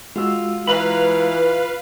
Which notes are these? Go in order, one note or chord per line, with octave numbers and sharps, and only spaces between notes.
G#3 F4 F#4 E6
E3 F4 B4 F5 A#5 B5